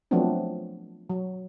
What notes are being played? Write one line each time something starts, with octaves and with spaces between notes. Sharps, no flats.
F3 F#3 A3 B3 C4 D4
F#3